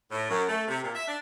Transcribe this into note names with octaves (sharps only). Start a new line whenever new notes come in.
A2
F#2
A3
C3
A#2
E5
D4